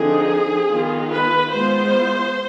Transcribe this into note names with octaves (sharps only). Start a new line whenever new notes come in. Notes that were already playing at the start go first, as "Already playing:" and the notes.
Already playing: D3 F3 C4 D#4 G#4
D#3 B3 F4
B4
G#3 B3 F4 C5